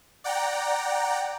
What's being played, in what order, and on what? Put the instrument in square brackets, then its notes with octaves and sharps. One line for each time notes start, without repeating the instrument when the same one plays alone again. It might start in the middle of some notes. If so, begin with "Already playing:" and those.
[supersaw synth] D5 F#5 G5 A#5